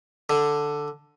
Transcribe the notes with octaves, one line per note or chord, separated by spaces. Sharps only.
D3